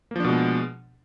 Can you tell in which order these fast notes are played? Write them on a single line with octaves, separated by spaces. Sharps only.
A#3 F3 D4 B2 G#3